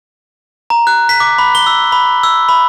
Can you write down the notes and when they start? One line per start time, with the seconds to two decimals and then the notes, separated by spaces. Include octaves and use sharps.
0.70 A#5
0.87 F#6
1.09 B6
1.20 D6
1.38 B5
1.55 G7
1.67 E6
1.92 B5
2.23 E6
2.49 B5